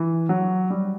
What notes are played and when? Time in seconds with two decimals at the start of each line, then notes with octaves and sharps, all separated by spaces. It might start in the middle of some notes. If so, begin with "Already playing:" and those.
Already playing: E3
0.29 F#3
0.70 G3